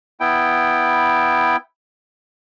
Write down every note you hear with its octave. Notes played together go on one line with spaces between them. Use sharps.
B3 E4 G5